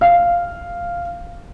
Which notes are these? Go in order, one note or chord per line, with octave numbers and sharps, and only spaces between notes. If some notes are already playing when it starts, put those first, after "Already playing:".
F5